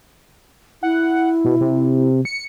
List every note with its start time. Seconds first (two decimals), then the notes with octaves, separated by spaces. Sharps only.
0.83 E4 F#5
1.44 B2
1.60 C3
2.25 C#7